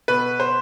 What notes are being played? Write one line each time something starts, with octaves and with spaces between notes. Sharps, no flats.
B2 B4
C5